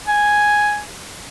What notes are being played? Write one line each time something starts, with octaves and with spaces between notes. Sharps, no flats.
G#5